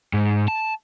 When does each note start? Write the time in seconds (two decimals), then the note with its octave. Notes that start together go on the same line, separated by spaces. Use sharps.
0.13 G#2
0.48 A5